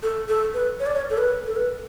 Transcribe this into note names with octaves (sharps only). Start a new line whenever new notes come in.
A4
A4
B4
C#5
D5
C#5
A4
B4
A4
B4